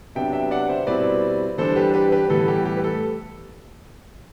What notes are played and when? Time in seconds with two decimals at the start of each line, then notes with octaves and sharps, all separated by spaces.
0.15 C3 F#3 B3 D4 E5 G5
0.33 E5 G5
0.51 D5 F#5
0.69 C5 E5
0.87 B2 G3 C4 E4 B4 D5
1.58 E3 G3 D4 A4 C5
1.76 G4 B4
1.94 G4 B4
2.12 G4 B4
2.30 A2 E3 G3 B3 A4
2.48 G4
2.65 G4
2.77 B4
2.84 A4